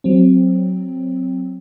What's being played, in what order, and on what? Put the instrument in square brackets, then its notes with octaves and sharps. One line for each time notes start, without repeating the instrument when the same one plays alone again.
[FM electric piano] F#3 C4